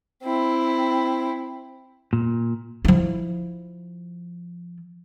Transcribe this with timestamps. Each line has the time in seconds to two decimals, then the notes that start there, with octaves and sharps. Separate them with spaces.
0.23 C4 E4
2.13 A#2
2.85 F3 E4